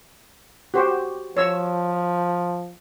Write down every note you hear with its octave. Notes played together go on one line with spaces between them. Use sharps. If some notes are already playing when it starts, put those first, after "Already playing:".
F#4 G4 C5
F3 C#5 E6